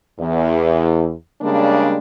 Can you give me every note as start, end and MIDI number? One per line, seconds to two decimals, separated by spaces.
0.20 1.13 40
1.41 1.98 49
1.41 1.98 55
1.41 1.98 56
1.41 1.98 58
1.41 1.98 62